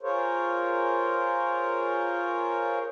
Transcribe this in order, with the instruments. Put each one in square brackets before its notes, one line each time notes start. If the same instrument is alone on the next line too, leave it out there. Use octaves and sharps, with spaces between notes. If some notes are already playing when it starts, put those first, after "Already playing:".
[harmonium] F4 G#4 A#4 C5 C#5